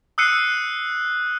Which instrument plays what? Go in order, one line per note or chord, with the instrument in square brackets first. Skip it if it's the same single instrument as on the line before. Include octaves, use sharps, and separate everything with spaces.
[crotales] D#6 E6 F#6 C7 C#7 D#7